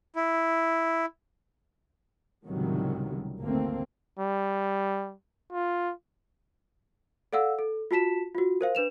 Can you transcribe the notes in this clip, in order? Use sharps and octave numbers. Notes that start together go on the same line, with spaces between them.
E4
C#2 A2 C3 D#3 F#3 G3
G#1 D2 A3 A#3 C4
G3
F4
A4 D5 F5 F#5 E6
A4
F4 F#4 A5 B6 E7
F4 F#4
A#4 C5 F5
D4 B4 E7 F7